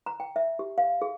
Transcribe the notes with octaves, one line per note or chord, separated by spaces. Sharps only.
A#5
G5
E5
G4
F5
G#4